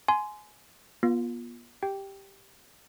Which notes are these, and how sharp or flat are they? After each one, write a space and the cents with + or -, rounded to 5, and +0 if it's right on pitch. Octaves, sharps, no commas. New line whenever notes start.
G#5 +20 C6 -10
B3 -40 F4 +0
G4 +0 G5 +0